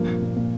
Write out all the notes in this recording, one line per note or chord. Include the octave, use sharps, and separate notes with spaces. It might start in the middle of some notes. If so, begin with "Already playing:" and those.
Already playing: G2 F3 A#3
A#2
A#2
A#2